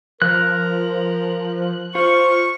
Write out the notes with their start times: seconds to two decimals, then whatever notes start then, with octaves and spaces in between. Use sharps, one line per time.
0.22 F3 A#4 F#6
1.95 F4 C5 C#6